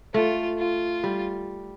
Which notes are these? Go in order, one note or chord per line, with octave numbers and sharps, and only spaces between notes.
A3 F4
F4
G3